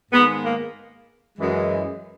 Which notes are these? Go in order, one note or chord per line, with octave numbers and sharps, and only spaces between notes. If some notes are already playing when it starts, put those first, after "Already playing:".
G#2 D#3 G#3 B3
A#3
F#2 E3 G#3